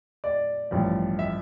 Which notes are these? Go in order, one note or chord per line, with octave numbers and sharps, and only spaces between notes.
D5
A1 G2 F3
E5